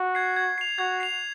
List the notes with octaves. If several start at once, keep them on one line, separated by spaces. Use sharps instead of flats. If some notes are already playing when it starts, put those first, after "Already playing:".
Already playing: F#4
G#6 C7
G#6
C7 F7
F#4 G#6
C7 F7